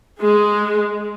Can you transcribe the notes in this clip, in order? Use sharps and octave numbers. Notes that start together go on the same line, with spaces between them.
G#3 G#4